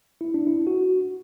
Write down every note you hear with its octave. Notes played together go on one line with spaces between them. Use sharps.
E4
D4
E4
F#4